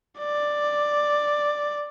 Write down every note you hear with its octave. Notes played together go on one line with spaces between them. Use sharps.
D5